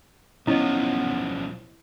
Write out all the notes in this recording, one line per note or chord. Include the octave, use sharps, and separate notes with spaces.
B1 F3 B3 C#4 D#4 E4 D#5